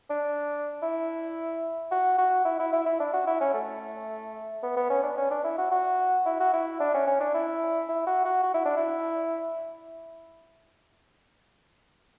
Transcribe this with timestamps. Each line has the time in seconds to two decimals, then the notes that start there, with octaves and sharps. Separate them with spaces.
0.10 D4
0.83 E4
1.91 F#4
2.18 F#4
2.45 E4
2.59 E4
2.73 E4
2.86 E4
3.00 D4
3.13 F#4
3.27 E4
3.41 C#4
3.54 A3
4.63 B3
4.76 B3
4.90 C#4
5.04 D4
5.17 C#4
5.31 D4
5.44 E4
5.58 F#4
5.71 F#4
6.26 E4
6.40 F#4
6.54 E4
6.80 D4
6.94 C#4
7.07 C#4
7.21 D4
7.34 E4
7.89 E4
8.07 F#4
8.25 F#4
8.43 F#4
8.54 E4
8.65 D4
8.77 E4